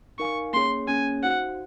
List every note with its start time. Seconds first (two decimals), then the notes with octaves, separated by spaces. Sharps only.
0.19 D#4 A#4 F5 G#5 C#6
0.53 A#3 C#4 G#4 C#5 C6
0.88 A#3 C#4 G#4 C#5 G#5
1.23 D#4 F#4 C5 F5 F#5